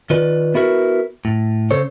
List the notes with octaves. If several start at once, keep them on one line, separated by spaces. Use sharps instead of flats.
D#3 F4 B4 D5
B3 E4 F#4 A#4 B4
A2
C#3 A4 C5 C#5